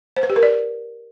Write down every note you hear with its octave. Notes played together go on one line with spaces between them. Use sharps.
C5
B4
G4
A#4
D5